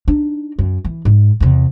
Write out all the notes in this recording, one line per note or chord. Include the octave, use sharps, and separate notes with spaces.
D4 D#4
F#2
E3
G#2
E2 C3